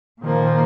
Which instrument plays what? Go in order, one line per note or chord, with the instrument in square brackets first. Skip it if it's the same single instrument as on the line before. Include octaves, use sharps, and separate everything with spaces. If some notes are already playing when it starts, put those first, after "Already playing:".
[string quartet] A#2 F3 A#3 [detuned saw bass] D#3